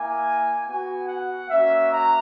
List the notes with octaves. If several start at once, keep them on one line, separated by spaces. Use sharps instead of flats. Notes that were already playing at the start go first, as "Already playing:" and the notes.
Already playing: A#3 E4 G#5
B3 F#4 G#5
F#5
A#3 C#4 F#4 E5
A#5